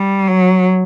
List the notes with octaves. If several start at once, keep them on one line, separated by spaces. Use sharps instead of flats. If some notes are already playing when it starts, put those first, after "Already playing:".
Already playing: G3
F#3